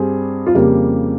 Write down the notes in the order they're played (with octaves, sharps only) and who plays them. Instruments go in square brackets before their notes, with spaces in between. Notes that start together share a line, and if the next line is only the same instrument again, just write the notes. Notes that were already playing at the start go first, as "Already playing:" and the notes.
Already playing: [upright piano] G2 G3 C4 G#4
F4
F2 C#3 G3 A#3 G4